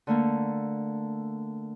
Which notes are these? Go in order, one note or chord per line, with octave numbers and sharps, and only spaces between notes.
D3 A3 A#3